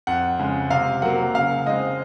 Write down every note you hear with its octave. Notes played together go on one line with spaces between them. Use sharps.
F2 F#5
C#3 G#3
C3 F5
F#3 A#3 F#5
C#3 F5
G#3 C4 D#5